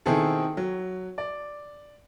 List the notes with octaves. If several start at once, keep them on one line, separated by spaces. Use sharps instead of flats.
B2 D#3 C4 E4 G#4 A4
F#3
D5